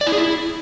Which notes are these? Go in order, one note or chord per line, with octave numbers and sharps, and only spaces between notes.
D5
E4
G#4
E4